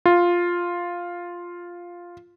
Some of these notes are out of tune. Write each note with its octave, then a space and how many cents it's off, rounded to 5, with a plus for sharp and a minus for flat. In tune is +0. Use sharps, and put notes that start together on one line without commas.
F4 +0